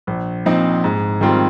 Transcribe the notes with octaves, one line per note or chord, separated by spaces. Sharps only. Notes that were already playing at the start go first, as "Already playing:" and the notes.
A#1
A#2 F3 C4 D#4
G#2
D#3 G3 C4 F4